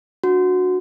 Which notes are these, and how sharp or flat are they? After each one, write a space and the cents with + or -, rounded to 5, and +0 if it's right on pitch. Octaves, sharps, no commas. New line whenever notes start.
D4 +0 F#4 -15